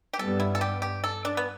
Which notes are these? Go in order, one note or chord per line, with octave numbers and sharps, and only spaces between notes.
G4
G2 G3 B3 A4
E4
A4
G4
G4
A4
D4
B3